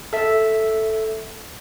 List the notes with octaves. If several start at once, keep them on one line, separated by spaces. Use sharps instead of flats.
A4 E5